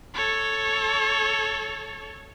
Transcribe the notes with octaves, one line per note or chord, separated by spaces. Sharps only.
A4 C#5